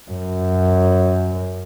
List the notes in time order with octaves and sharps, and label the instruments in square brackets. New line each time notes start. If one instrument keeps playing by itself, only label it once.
[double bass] F#2